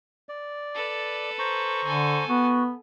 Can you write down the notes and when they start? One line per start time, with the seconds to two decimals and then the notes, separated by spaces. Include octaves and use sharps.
0.29 D5
0.75 A4 B4
1.39 C5 A#5 C#6
1.85 D3 A4 G#5
2.29 B3 F#4